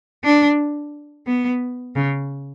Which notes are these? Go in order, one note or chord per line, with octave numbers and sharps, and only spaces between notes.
D4
B3
C#3